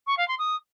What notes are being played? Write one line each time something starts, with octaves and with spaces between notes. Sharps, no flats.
C#6
F5
C6
D#6